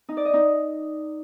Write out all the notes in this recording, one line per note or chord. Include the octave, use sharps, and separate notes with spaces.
D#4
D5
D#5
D#4